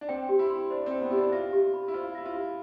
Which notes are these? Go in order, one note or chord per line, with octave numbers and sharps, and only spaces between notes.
D4
C4 G5
G4
E4
C6
D4 C5
C4
G5
B3
E4 G4
D4
F4 E5
G4
B5
E4
F4 C5
E4 E5
F4
G4